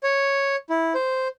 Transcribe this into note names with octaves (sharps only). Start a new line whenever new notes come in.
C#5
E4
C5